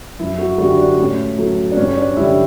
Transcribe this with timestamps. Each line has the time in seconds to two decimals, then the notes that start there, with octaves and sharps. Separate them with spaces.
0.19 F#2 E4
0.38 F#4
0.58 D3 G3 F#4
0.78 D4
0.98 A2 C#4
1.38 F#3 A3
1.72 D4
1.77 G2 C#4
1.97 D4
2.17 D3 G3 E4